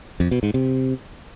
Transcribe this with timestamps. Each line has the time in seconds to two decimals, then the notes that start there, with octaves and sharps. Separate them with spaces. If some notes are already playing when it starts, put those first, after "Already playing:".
0.20 F2
0.31 B2
0.43 G#2
0.54 C3